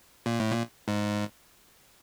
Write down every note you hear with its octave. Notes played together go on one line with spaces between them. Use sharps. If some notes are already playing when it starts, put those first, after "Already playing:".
A#2
A2
A#2
G#2